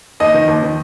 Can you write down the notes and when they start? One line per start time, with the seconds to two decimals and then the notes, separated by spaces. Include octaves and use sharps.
0.20 D#2 D#5
0.34 D#3
0.48 D#2
0.62 D#3